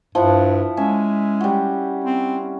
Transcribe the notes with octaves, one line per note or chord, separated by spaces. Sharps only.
G2 F3 E4 F#5
G#3 C#4 E5
G3 F#4
C4